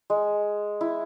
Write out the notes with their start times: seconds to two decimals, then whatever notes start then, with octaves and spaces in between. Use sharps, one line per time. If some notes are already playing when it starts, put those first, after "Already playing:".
0.10 G#3
0.81 E4